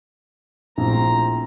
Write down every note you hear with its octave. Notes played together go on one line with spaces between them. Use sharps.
A#1 A2 C4 A#5